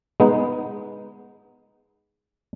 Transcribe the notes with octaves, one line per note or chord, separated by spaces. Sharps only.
G#3 B3 D#4